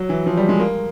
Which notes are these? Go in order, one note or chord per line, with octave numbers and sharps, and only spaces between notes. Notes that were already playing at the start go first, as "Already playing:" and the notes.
Already playing: F#3
E3
F3
G3
G#3
A#3